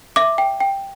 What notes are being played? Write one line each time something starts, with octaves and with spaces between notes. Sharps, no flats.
E5 D6
G5
G5